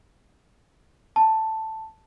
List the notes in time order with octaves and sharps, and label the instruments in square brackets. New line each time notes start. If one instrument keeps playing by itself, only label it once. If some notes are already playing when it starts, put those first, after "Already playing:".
[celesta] A5